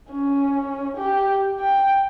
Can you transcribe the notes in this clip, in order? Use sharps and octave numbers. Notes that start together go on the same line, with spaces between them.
C#4
G4
G5